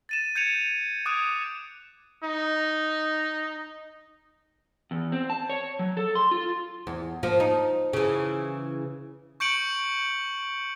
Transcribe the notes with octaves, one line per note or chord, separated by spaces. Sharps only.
A6 D#7 E7
G6 G#6 C#7 D#7 F7
D6 D#6 F#6 G#6 D7 D#7
D#4
E2
C4
A5
C#5
F#3
A4
C6
F4
E2
F3 A#3
D#4
C#3 E3
C#6 G6 C#7 D7 F#7